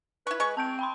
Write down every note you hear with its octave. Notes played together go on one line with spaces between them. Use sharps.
E4 B4 C#6
G#3 C#6
C4 A5 G6 D7
G5 B5 C6